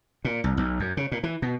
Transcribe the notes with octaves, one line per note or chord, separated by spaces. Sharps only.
A#2
C2
B1
F#2
C#3
A#2
E3
B2